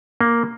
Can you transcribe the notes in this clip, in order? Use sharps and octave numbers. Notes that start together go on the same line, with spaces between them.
A#3